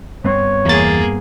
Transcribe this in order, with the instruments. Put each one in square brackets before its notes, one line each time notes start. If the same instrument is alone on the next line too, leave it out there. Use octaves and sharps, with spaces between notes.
[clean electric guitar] G2 B3 C4 [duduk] C#5
[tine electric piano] E2 A6 [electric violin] A#3 G#4